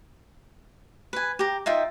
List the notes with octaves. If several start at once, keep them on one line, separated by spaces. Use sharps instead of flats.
B4 G#5
G4 A#5
D#4 F4 E5 G5